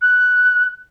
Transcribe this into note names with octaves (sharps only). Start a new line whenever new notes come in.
F#6